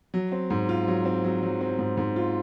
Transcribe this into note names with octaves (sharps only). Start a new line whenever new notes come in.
F#3
C4
G#2
F4
F#3
C4
F#3
F#3
C4
G#2
G#2
F4